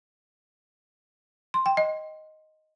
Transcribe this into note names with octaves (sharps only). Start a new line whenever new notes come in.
C6
G5
D#5